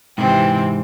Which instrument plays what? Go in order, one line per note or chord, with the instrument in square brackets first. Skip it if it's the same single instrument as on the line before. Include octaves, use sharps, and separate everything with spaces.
[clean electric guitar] G#2 [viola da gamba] C3 E3 [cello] C4 [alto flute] G5